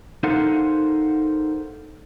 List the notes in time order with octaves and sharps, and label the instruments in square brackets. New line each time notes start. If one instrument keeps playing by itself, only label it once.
[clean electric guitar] D#4 A4 A#4 C5 F5 F#5